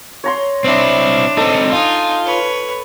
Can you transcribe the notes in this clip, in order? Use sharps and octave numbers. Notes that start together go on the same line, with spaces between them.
C#5 A#5 C6
C4 D4 E4
C4 D#4 A4
D#4 F4 G#5
B4 C#5